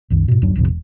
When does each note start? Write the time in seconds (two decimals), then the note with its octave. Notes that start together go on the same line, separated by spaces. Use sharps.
0.10 C2 F#2 D#3
0.28 G#2 B2
0.42 D1 F#2 F#3 D4
0.56 D1 A#1 F2 C3
0.68 E1